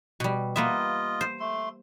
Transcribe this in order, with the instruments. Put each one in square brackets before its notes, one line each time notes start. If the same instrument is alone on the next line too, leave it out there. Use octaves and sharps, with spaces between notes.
[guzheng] B2 G3
[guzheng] A#3 B3 E5 [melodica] F4 D#5
[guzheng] C5
[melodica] A3 C6